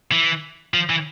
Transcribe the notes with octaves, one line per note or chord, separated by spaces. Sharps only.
E3
F3
E3